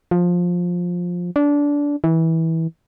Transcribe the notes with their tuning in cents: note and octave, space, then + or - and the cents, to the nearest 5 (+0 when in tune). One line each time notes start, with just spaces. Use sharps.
F3 +15
D4 -20
E3 -20